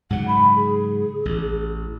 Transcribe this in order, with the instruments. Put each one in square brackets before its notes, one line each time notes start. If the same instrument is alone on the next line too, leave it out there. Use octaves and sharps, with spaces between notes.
[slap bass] G#2 C#3 F#3 [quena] F#5
[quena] B5
G#4
[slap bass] A1